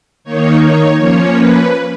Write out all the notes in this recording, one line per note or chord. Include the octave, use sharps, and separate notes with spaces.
D#3 A#3 D#4 C#5
C#5
F3 A#3 C#4 C#5
B4